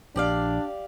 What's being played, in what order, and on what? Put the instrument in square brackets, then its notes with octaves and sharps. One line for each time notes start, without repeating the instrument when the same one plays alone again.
[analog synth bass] A#1 [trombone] D4 [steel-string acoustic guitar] G4 D5 F5